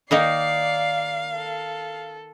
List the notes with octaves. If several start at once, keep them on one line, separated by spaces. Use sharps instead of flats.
D#3 A#3 D#4 D5 F5 C7
A4